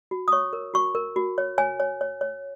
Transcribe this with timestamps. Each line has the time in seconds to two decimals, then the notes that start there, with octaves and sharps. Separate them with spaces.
0.11 F#4
0.28 D#6
0.32 C#5 C#6
0.53 A#4
0.74 F#4 C#6
0.95 A#4
1.16 F#4
1.38 C#5
1.58 C#5 G#5
1.80 C#5
2.01 C#5
2.21 C#5